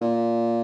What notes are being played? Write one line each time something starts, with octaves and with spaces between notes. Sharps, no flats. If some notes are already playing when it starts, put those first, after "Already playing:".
A#2